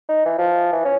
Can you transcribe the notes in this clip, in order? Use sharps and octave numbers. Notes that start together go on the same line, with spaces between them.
D#4
E3
F3
E3
C#4